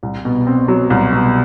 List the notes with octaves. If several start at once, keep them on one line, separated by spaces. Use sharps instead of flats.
C2
B2
C4
F#3
C2
B2